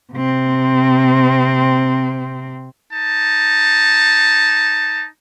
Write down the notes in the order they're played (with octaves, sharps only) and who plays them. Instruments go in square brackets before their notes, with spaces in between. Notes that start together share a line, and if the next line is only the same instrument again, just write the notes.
[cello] C3 C4
[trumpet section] D#4 A5